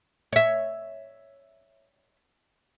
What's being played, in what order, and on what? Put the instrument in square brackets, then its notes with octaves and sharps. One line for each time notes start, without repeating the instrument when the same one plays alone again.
[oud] C#5 E5